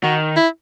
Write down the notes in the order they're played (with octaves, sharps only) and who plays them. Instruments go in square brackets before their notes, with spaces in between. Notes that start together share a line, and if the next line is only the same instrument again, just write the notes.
[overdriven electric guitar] D#3 [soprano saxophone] F#4
[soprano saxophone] E4